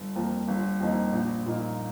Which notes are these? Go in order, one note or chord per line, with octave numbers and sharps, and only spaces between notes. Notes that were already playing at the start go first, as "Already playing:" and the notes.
Already playing: G1
F2 F3 A#3
G1
F2 F3 A#3 D#4
A#1
A#2 F3 A#3 D#4